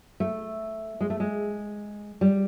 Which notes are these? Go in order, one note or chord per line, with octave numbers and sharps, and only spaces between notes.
A3
G#3
A3
G#3
G3